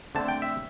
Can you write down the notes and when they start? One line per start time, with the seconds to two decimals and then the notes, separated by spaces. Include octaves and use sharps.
0.15 D3 A3 C4 A5
0.28 G5
0.42 E5